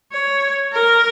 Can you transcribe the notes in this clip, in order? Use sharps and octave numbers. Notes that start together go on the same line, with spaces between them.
C#5
A#4